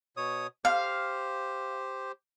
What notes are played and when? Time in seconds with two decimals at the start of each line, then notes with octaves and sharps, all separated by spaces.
0.17 B2 C#5 D#6
0.65 G4 C5 F5